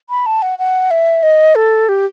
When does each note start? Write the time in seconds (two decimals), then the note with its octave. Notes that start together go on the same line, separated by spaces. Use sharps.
0.10 B5
0.26 A5
0.42 F#5
0.59 F#5
0.91 E5
1.23 D#5
1.55 A4
1.89 G4